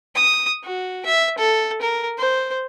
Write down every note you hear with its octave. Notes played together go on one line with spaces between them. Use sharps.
D#6
F#4
E5
A4
A#4
C5